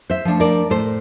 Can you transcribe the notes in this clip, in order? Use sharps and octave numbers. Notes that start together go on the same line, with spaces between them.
C5 E5
F3 A3 D4
A#4 D5
A2 A4 C5